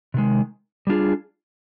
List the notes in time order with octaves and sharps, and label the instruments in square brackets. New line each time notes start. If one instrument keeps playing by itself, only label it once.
[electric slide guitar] C3 D#3 G#3
G3 D4 F4 G#4